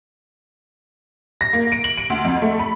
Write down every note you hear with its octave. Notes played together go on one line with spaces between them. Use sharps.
A#6
A#3
D7
F#7
D7
D2
F2
A3
B5